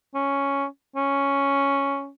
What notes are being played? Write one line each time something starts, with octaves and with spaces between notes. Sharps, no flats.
C#4
C#4